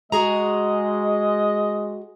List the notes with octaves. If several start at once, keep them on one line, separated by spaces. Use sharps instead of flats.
G#3 F#4 G#4 D#5 A#5